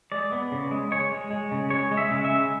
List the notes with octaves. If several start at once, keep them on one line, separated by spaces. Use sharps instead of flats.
G#3 D5
B3
C#3
G#3
G#3 C#5
G#3
G#3
C#3
G#3 C#5
G#3
E5
C#3
E5
G#3